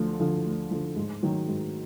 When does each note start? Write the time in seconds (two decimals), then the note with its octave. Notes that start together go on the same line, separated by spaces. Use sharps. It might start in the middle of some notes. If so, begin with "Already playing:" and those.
Already playing: D2 D3 F3
0.20 D3 F3
0.46 D2
0.71 D3 F3
0.96 G#2
1.23 D#3 F#3
1.48 G#2